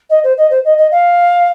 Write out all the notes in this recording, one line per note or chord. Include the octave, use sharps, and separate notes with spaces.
D#5
C5
D#5
C5
D#5
D#5
F5